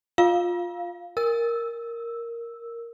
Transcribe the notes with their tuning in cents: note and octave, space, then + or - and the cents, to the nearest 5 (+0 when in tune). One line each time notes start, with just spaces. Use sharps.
F4 +10 F5 +0
A#4 +0 E6 +0